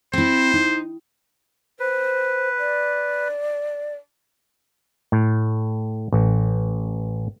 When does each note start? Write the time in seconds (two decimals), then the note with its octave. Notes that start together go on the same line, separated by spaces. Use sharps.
0.13 C4 E4 C5
0.54 D#4
1.80 B4 C5
2.59 D5
5.12 A2
6.12 A1